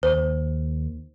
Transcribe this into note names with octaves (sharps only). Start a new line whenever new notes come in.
D#2 C5